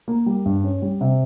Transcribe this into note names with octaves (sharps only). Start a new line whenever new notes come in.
A#3
G3
G2
C#4
G3
C3